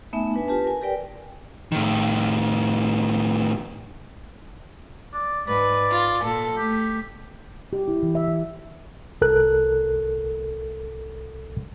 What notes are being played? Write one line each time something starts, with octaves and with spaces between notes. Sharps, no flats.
A3 B3 D#4 E5 G#5
D4 B4 G#5
F4 G4 B4 A5
A#4 G#5
G4 A#4 B4 D5 G5
A2 D#3
D5
G#2 B4 D5
F4
A#2 A4
A3 G4
G4
E4
E3
E5
E3
C2 A4 A#4 F#6